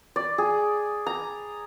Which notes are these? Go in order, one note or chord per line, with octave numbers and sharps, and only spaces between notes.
D5
G#4
A#5